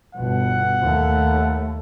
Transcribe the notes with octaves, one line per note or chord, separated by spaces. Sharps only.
G1 B2 F#5
D#2 A3